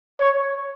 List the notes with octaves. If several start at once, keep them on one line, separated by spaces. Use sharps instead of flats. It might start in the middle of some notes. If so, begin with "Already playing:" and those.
C#5